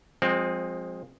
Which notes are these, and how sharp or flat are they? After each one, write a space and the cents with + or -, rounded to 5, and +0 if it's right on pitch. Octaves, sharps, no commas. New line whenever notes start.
F3 +30 G#3 -15 C4 +10